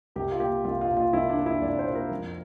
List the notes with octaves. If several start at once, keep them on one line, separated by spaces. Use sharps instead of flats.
C2 G4
F4
A#2 G4
C2 F4
F4
A#2
F4
C2 E4
D4
A#2
E4
C2 D5
C5
A#2
A#4
F2